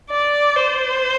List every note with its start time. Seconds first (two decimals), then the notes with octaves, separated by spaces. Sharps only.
0.11 D5
0.57 C5